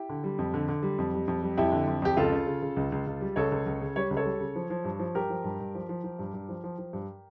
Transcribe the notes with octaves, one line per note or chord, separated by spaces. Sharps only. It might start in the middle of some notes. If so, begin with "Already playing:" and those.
Already playing: E4 G4
D3
G3
F2
D3
D3
G3
F2
G3
F2
G3
F2 E4 G4
D3
F2
F2 G4
C#2 F4 A4
C#3
C#3
C#3
C#2
C#2
C#2
G3
C#2 A4 C#5
C#2
C#2
C#3
G3 C#5
C#2
A4 C#5
G3
C#3
F3
F3
G2
F3
G2 G4 A#4
F3
G2
G2
F3
F3
F3
G2
G2
F3
F3
F3
G2